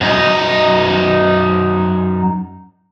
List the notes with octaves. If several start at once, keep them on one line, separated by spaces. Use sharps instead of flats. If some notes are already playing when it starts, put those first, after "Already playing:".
F#2 D#4